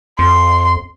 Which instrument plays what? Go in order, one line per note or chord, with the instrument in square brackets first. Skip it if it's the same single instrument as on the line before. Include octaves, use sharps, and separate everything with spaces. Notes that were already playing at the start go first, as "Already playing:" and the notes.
[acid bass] F2 [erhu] C6